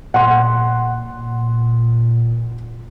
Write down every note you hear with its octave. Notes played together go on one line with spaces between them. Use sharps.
A#2 F#5 C6